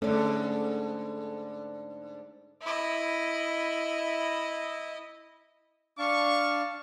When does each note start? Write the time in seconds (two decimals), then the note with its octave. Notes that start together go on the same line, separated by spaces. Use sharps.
0.02 G#2 D3 A3 C#4 A4 D5
2.62 E4 D#5
5.99 D4 F5 A5 C#6